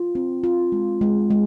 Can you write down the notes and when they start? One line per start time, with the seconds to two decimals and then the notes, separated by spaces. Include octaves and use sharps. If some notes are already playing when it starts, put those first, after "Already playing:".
Already playing: F4
0.15 C4
0.44 F4
0.72 G#3
1.01 G#3
1.30 G#3